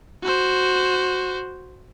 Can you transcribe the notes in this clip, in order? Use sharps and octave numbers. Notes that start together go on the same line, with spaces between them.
F#4 C5